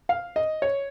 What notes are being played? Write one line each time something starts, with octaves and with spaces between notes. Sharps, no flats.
F5
D#5
C#5